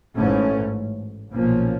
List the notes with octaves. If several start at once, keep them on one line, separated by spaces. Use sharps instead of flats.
A1 G#2 E3 A3 C#4
B1 A#2 F3 A#3 C#4